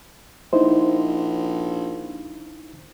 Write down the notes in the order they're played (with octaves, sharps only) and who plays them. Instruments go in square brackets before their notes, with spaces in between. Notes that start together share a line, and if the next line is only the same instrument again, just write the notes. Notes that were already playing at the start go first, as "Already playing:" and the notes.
[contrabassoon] A#1 [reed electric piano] D#4 E4 C5